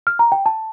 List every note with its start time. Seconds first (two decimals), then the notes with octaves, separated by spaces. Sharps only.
0.07 F6
0.19 A#5
0.32 G5
0.46 A5